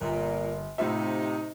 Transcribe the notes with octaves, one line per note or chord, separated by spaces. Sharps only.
G1 A#2
A2 C3 D#4 F4 E5